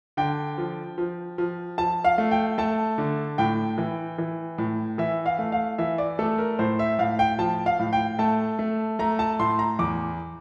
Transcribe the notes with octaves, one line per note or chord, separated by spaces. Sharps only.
D3 G5
F3
F3
F3
F3 A5
F5
A3
G5
A3 A5
D3
A2 G5
E3
E3
A2
E3 E5
F5
A3
F5
E3 E5
D5
A3 A4
A#4
A2 C5
E5
A2 F5
G5
F3 A5
F5
A2
G5
A3 A5
A3
A3 A#5
A5
A2 C6
A#5
E2 D6